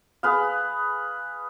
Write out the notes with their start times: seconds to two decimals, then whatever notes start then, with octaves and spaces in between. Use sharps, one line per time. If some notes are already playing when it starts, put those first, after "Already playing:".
0.23 G#4 B4 F5